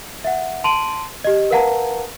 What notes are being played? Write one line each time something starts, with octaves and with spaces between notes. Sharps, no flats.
E5 F#5
A5 C6 D7 D#7 F#7
G4 D#5
A#4 B4 F5 F#5 A5 A#5